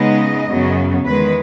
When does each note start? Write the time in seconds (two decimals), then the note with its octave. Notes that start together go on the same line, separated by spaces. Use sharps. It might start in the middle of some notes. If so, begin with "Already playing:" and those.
Already playing: C#3 G#3 B3 D#4 D#5
0.48 F#2 C#3 F#3 B3
1.04 E2 D#3 G#3 B4